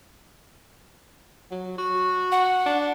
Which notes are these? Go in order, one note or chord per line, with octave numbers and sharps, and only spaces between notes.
F#3
F#4
F#5
D4